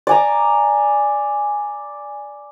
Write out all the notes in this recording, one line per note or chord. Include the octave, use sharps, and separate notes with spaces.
D5 G#5 A#5